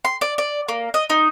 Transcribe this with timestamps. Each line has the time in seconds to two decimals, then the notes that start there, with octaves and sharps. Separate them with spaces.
0.05 C6
0.21 D5
0.38 D5
0.68 A#3
0.94 D#5
1.10 D#4